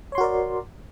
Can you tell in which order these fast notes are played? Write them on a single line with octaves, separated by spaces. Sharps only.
C#5 C6 F#4 A#4 D5